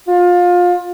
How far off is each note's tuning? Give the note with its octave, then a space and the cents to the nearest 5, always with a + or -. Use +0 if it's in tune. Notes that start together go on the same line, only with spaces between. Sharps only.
F4 +25